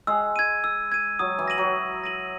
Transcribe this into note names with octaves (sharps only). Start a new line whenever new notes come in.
G#3 E6
G#6 D#7
E6
G#6 D#7
F#3 D#6
E3
A#6 D#7 F#7
F#3
D#6
A#6 D#7 F#7